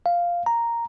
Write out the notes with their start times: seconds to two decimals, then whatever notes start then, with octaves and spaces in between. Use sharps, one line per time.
0.06 F5
0.46 A#5